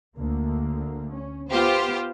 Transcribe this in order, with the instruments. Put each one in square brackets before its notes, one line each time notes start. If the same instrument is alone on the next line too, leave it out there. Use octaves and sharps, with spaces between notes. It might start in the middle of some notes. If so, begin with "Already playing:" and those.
[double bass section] D2 D3 A#3
C#4
[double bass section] B3 [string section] F4 G4 C5